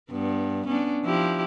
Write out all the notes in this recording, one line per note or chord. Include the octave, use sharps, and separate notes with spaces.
G2 B3
B3 C#4 D4
F3 E4 G4